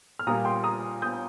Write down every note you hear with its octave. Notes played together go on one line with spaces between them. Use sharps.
F6
A#2 G3 A#3 A#5 D#6
G5 C6
A#5 D#6
D#6 G6